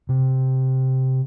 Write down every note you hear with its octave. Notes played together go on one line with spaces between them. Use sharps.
C3